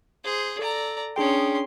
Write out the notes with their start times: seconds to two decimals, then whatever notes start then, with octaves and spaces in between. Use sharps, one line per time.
0.24 G#4 C5
0.59 A4 D5 A#5
1.16 C#4 D4 G#4 G5 C6